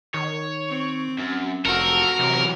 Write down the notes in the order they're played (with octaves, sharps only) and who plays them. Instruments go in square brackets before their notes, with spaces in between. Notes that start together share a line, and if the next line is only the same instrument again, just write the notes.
[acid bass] D#3 [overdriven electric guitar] C#5
[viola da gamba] C4
[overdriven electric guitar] F#2
[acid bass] F1 [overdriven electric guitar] C4 A4 [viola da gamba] F#4 [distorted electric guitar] A#4
[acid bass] C3 [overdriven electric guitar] E3 F#3